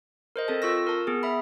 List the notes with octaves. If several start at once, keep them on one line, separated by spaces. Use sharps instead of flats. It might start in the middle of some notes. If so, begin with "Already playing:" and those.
A#4 C5 D#5
C4 A4 A5
F4 C#6 E6 A#6
A#4 A5
B3 G#4
E5 B5